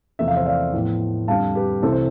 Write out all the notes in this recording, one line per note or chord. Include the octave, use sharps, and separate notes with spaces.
E2 C3 F3 A3 E5
F5
C5 E5
D5 F5
A2 F3 B3
F2 D3 G3 F5 A5
G4 B4
C2 C3 E3 A3 C4 A4 C5
C5